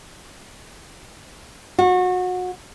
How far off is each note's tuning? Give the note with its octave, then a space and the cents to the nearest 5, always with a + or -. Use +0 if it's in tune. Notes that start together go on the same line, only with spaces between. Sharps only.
F#4 -25